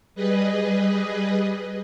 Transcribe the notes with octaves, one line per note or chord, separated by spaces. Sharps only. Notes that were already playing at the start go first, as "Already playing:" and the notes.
G3 G#4 B4 D#5